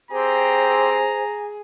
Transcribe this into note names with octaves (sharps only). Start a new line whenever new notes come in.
C4 G4 G#4 C5 A#5